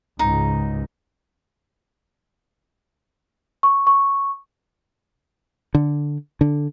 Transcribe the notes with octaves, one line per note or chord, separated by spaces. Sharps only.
C#2 G#2 C#3 D#4
C#6
C#6
D3
D3